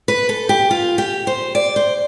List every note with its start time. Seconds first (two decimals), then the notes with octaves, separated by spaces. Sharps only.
0.08 B4
0.29 A4
0.49 G4
0.71 F4
0.98 G4
1.27 C5
1.55 D5
1.76 C5